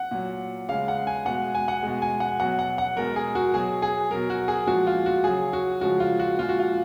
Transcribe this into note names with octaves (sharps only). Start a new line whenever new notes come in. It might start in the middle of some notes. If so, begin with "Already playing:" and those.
Already playing: F#5
A#2 F#3
C#3 G#3 F5
F#5
G#5
B2 G#3 F#5
G#5
F#5
B2 G#3
G#5
F#5
B2 F#3 F#5
F#5
F#5
B2 G#3 A#4
G#4
F#4
B2 F#3 G#4
G#4
B2 F#3 A#4
F#4
G#4
A#2 F3 G#3 F#4
F4
F#4
C#3 F#3 G#4
F#4
C#3 F3 G#3 F#4
F4
F#4
A#2 F3 G#3 F4
F#4
F4